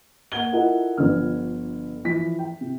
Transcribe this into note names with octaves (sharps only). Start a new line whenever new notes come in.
A#3 F#5 G#6 G7
E4 F4 A4 A#4 D#5 F#5
G1 D3 F3 F6
E3 F3 B6
G5
C3